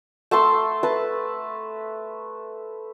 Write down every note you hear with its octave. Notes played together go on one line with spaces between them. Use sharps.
A3 A5 C6 E6
B4 E5 A5